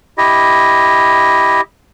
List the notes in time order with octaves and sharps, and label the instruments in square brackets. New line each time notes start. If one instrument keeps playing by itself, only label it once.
[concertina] E4 G4 D#5